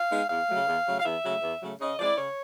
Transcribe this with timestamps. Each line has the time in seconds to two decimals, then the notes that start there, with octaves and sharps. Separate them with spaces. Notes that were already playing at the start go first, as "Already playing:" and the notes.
Already playing: F5
0.10 G#3 B3 D#4
0.30 E2 F5
0.48 C#3 F#3 A3
0.67 E2
0.86 C#3 F#3 A3
1.00 F5
1.05 E2 E5
1.24 C#3 F#3 A3
1.42 E2
1.62 C#3 F#3 A3
1.81 C#3 D#5
1.99 F3 G#3 C4 E4 D5
2.18 C#3 C#5